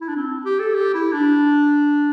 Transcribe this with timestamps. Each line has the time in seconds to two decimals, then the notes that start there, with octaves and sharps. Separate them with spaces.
0.01 E4
0.09 D4
0.16 C4
0.45 G4
0.60 A4
0.75 G4
0.95 E4
1.13 D4